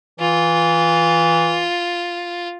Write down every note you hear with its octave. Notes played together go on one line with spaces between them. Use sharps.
E3 F4